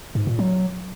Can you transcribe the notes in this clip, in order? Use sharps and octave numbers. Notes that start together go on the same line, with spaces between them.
G#2
A#2
F#3